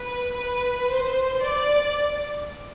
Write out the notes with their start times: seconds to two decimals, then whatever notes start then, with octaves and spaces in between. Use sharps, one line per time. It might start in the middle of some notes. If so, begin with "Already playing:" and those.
Already playing: B4
0.36 B4
0.90 C5
1.42 D5